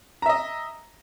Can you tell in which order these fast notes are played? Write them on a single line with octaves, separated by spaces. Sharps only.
A#5 E5 D#5